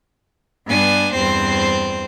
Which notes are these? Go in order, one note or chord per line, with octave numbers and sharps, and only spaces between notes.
G2 B3 D4 G#5
E2 G2 C4 C5